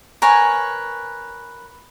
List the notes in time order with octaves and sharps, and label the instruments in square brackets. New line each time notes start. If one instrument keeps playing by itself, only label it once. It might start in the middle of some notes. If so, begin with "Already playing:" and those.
[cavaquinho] A#4 B4 C#5 G#5